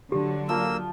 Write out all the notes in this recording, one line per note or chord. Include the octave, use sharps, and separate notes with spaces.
D3 F#3 G4
F3 A#3 E6